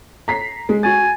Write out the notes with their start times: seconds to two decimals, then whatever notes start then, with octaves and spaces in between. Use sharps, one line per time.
0.28 A#5 B6 C7
0.69 G#3
0.83 F#4 G#5 A6